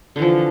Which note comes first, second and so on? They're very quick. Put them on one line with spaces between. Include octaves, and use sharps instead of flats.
D3 E3 F3